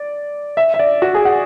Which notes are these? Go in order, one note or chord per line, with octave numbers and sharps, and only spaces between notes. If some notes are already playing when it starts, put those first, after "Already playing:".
Already playing: D5
E5
E5
D5
F#4
G#4
F#5